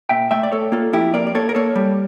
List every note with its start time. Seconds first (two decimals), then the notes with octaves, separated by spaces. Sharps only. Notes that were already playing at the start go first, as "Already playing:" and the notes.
0.09 A#2 E5 G5
0.31 A3 E5 G5
0.43 D5
0.52 A3 A4 C#5
0.72 A#3 F4 A4
0.93 F2 E4 G4
1.14 A#3 A#4 D5
1.27 D5
1.35 A#3 A4 C#5
1.49 A#4
1.55 A#3 A4 C#5
1.75 G3